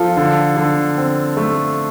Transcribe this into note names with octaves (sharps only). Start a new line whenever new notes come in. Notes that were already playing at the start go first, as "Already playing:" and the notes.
Already playing: F3 F4 A4
D3
D3
C4
A3